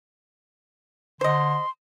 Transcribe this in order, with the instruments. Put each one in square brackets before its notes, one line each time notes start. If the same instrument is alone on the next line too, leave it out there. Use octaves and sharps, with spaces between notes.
[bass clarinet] D3 [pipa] C5 D#5 [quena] C6